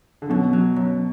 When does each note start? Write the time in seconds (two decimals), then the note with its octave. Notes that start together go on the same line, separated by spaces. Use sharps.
0.22 D3
0.30 F#2 B2
0.53 F#3
0.76 F#2